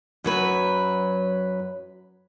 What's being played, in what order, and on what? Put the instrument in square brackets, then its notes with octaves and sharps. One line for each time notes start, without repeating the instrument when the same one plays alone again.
[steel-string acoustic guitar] F#2 F#3 B4